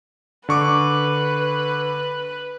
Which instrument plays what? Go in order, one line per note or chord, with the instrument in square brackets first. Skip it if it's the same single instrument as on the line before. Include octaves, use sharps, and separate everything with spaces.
[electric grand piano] D3 C#6 D6 [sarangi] B4